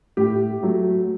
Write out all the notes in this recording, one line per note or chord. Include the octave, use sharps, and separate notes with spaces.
A2 G4
F#3 A3